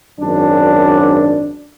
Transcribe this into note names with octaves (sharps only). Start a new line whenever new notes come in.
G#1 F#2 D4